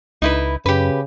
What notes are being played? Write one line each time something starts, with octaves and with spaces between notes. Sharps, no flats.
C#2 D#4 E4 B4
F#2 C#3 G4 B4